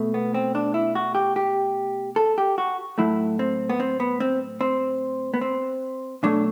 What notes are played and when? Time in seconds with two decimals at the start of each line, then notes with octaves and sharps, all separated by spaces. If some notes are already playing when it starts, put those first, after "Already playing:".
Already playing: B2 A3
0.14 B3
0.34 C4
0.55 D4
0.74 E4
0.95 F#4
1.15 G4
1.36 G4
2.16 A4
2.38 G4
2.58 F#4
2.98 A2 F#3 A3 E4
3.39 C4
3.70 B3
3.80 C4
4.00 B3
4.20 C4
4.61 C4
5.34 B3
5.41 C4
6.23 B2 F#3 A3 D4